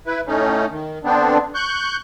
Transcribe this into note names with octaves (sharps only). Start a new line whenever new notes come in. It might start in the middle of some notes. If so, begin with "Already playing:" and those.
E4 B4
A2 A3 C#4 D#4
D#3
D3 B3 C4 D4
C#6 F#6 G6